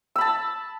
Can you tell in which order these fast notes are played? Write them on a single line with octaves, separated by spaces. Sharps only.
E6 B5 A5